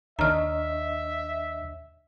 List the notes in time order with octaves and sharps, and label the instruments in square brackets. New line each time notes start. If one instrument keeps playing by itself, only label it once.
[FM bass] D#2 [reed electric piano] D4 C#5 D#5 [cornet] E5 [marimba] A#5 F6